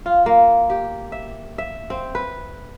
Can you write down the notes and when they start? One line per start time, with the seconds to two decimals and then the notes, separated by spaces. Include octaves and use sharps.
0.06 F4
0.26 A#3
0.70 G4
1.12 E5
1.58 E5
1.90 C4
2.15 B4